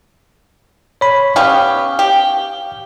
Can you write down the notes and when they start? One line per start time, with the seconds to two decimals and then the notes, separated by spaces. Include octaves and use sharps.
1.01 C#5 B5
1.36 B3 C#4 G4 F5
1.99 G4